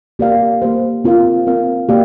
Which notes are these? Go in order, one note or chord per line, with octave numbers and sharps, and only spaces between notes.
A#3 G4 A#4 D5 F5
A#3 G4 C5
C4 F4 A#4 F5
C4 A#4 F5
A#3 G4 D5 F5